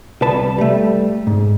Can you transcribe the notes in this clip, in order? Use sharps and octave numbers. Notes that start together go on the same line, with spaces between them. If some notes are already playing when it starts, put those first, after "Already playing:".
C2 B4 A5
G3 A3
G#2